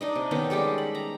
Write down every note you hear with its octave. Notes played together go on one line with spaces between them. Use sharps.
D4 D#4 D#5
C3
D#3 B3 C#4
G3 G#3 G4 A4
B5
A#5